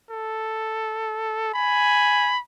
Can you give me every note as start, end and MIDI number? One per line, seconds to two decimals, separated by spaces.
0.10 1.51 69
1.54 2.35 80
1.54 2.39 83